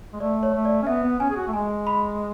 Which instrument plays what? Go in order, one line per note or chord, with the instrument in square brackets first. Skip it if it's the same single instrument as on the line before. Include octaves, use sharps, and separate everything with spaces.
[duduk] G#3
[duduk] A3 [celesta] D5
[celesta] C#5
[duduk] A3
[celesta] D5
[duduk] C#4
[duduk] B3 [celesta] E5
[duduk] B3
[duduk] C#4 [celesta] G#5
[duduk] G#4
F#4
A3
[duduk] G#3 [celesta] G#5
[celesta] B5